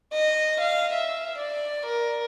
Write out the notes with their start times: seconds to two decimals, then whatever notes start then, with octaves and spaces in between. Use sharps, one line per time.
0.13 D#5
0.61 F5
0.93 E5
1.38 D5
1.86 A#4